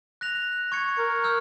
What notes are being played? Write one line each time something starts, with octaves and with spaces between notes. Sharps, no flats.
F#6 A#6 F7
C#6 G#6 C#7
A#4
E6 F6 G6